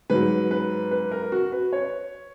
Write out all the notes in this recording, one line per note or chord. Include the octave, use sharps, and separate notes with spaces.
G#2 F#3 B4
B4
B4
A#4
F#4
B4
C#5